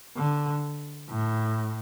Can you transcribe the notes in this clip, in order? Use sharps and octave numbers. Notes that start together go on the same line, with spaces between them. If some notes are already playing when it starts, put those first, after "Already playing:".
D3
A2